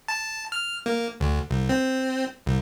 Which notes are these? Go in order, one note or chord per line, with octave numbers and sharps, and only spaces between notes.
A5
F6
A#3
D2
C2
C4
C2